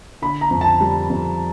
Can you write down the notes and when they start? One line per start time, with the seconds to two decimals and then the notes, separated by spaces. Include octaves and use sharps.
0.22 D3 B5
0.41 A#5
0.51 F2
0.61 A5
0.81 G3
1.10 F2